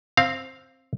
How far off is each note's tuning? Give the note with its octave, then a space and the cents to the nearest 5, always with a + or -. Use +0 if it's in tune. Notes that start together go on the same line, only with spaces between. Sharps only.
C4 +10 F5 +0